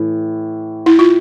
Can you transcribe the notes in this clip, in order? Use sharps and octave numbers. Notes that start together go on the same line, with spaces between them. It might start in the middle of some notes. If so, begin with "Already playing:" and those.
Already playing: A2 E3
E4
F4